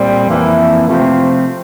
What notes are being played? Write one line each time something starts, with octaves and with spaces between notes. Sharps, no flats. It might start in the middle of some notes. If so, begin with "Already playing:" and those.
Already playing: A#2 G3 C4
F2 E3 A#3 E4
C3 F3 A3 C4